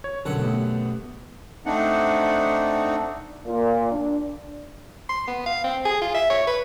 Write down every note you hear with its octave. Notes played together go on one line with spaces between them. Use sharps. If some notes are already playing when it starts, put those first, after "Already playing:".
C#5
B1 F#2 D3 F#5
A3 B3 G4
A3 C4 D4 D#4 F#5
A#2
D4
C6
B3
F5
C4
G#4
F4
E5
C#5
B4